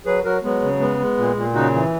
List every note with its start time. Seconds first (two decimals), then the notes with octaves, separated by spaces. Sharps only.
0.06 F#3 G#4 B4
0.25 F#3 F#4 A#4
0.43 F#3 G#3 B3
0.62 C#3
0.80 G#3 B3
0.99 G#3
1.17 A#2
1.36 A#2
1.55 C#3 D#4 F#4
1.73 E3